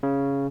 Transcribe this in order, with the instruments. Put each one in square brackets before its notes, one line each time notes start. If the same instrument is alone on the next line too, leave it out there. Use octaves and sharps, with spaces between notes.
[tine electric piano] C#3